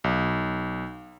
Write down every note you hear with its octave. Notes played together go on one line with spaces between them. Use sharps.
B1